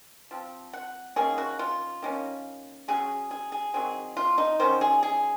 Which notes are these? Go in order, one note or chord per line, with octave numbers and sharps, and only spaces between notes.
F3 C4
F#5
D#3 A#3 C#4 G#4
F#4
F4
D#3 A#3 C#4
C#3 F#3 C#4 G#4
G#4
G#4
D#3 F#3 C4 G#4
F4
D#4
D#3 F#3 C#4 C5
G#4
G#4